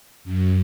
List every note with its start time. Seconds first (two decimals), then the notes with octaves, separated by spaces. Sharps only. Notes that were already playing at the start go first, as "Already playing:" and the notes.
0.24 F#2